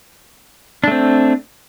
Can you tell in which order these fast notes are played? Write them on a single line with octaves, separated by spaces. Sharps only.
D4 A3 C4